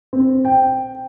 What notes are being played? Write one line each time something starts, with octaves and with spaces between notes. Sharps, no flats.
C4
G5